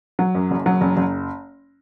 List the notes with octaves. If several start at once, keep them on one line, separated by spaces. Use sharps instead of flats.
F#3
F#2
F#1
F#3
F#1
F#1